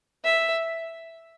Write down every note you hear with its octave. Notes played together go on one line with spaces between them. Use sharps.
E5